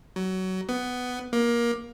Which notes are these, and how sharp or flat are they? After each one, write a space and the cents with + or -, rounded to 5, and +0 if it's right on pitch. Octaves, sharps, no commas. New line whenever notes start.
F#3 +20
B3 +10
A#3 +20